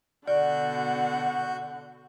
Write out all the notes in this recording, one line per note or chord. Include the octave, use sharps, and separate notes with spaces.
B2 D3 F#4 D5 F#5 C#6 G6